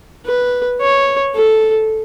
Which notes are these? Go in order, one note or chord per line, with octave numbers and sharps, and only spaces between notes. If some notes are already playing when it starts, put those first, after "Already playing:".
B4
C#5
A4